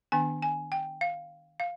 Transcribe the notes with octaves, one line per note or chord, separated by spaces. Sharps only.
D#3 B3 D4 G#5
G#5
G5
F5
F5